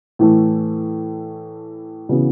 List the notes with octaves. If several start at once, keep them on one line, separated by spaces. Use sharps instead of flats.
A2 E3 A3
C#3 E3 B3 F#4